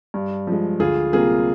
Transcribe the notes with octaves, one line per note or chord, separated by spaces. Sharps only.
G2
F3 G#3
D2 F4 G#4
C3 G3 A#3 F4 G#4